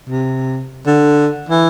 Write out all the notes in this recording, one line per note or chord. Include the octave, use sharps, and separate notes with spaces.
C3
D3
E3